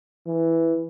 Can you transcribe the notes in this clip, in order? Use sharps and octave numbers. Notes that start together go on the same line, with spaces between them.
E3